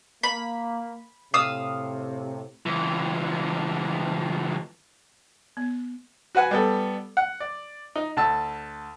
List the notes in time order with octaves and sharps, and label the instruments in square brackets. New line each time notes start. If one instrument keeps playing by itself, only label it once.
[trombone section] A#3 [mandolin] B5
[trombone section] A2 C3 [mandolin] F5 D#6 E6
[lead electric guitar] C#2 E3
[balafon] B3
[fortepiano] F#4 B4 F#5 G#5
G3 B3 A4
F#5
D5
D#4
D2 A5 E6